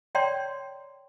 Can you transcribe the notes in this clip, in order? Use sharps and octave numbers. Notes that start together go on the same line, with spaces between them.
C#5 D5 G5 A#5 C6